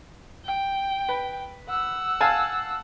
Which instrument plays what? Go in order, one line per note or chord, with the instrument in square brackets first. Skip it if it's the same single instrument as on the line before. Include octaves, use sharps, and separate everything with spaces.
[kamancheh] G5
[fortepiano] B4
[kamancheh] F#5 E6
[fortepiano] F5 G#5 A5